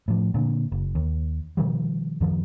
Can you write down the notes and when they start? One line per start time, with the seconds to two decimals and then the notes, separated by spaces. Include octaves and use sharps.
0.08 A2 F3
0.34 A#2 D3
0.72 F#1
0.95 D#2
1.57 B2 D#3 F3 G3
2.21 F#2 D#3 F3